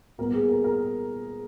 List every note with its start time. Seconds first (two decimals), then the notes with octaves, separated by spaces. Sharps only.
0.18 A#2 G3 B3 A#4
0.33 G#4
0.49 A#4
0.64 A#4